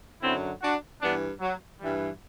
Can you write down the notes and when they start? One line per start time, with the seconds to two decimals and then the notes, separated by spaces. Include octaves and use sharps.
0.21 F#2 D3 F#3 C4 E4
0.62 D4 F#4
1.01 G2 E3 B3 D4
1.41 F#3
1.80 G2 E3 G3